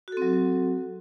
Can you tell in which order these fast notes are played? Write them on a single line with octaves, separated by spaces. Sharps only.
F#4 A4 C4 F#3